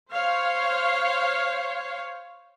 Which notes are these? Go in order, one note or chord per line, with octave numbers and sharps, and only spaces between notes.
C5 C#5 F5